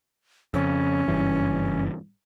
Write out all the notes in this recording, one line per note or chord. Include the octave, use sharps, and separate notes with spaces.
F2 C#3 C#4
F#1 G2 E3